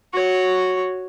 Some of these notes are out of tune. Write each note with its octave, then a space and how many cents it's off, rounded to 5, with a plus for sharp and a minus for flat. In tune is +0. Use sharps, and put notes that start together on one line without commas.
F#4 +0 C#5 +0